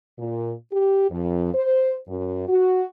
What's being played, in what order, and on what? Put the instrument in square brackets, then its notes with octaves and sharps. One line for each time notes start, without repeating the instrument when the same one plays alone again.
[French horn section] A#2
G4
F2
C5
F#2
F#4